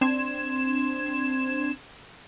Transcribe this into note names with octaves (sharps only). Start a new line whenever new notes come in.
C4 D4 C6 G#6 E7